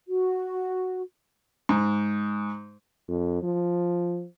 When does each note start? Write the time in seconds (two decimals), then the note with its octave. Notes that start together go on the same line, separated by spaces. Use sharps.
0.08 F#4
1.69 G#2
3.09 F2
3.43 F3